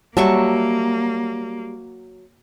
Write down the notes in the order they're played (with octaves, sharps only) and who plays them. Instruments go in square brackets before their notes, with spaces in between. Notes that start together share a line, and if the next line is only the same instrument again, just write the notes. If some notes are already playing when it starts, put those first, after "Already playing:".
[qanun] F#3 E5 C#6 [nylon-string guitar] G3 A5 [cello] A#3